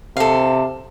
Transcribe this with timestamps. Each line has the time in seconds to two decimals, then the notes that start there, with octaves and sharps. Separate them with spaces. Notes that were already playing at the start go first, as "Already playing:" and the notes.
0.17 C3 A4 F5